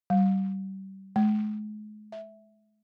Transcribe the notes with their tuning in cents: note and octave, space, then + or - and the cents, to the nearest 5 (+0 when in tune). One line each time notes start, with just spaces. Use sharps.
G3 -30
G#3 +40
E5 -5